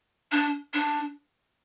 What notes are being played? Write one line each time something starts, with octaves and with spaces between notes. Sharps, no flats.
D4
D4